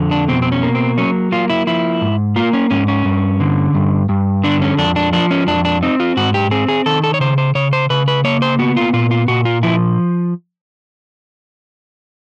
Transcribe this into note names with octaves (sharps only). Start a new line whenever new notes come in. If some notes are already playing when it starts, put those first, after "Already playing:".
Already playing: F2 D3
D4
B2 C4
C4
C#4
A#3
C4
F#3 C#4
A#3 F4
E4
F3 E4
G#2
A#3 F4
C#4
G#2 C#4
C#4
G2
D3
G2
G2
D3 D4
C#4
F2 D4
D4
F3 D4
C#4
F2 D4
D4
C4 D#4
F4
G#2 F#4
G4
C4 G#4
G#4
D#3 A4
A4
C#5
C#3 C5
C5
C#3 C#5
C5
C#3 B4
B4
A#3 C#5
C5
B3 F#4
F4
A#2 F4
F4
A#2 F#4
F4
F3 E4